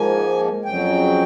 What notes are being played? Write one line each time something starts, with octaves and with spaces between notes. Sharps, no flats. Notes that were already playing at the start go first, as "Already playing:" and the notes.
Already playing: G#2 F3 A#3 G#5
F2 C#3 F#3 G5